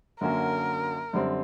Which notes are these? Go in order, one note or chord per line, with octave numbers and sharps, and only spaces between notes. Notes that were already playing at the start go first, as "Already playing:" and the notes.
F#2 D3 F#3 A#3 C#4 A#4
F#2 D3 G3 C4